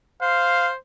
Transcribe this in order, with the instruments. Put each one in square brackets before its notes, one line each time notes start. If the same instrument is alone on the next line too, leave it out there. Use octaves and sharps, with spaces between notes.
[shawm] C5 [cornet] F5